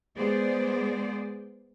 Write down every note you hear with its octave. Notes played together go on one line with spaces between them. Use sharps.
G#3 B3 G#4 C5 D5